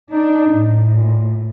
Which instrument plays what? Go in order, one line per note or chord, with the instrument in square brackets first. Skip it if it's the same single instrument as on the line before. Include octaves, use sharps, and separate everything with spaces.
[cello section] D4 [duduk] D#4
[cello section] A2
[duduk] A#2